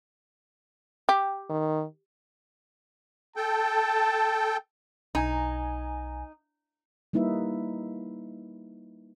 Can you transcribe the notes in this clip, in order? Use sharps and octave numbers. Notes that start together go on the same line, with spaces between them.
G4
D#3
A4 G5 A5
B1 D#4 G#5 A#5
G3 A#3 D#4 E4 B4 E5